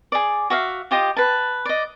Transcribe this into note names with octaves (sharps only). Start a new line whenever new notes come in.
G#4 D5
F#4 E5 F5
F4 G4 D#5 D#6
B4 A5
D5 D#5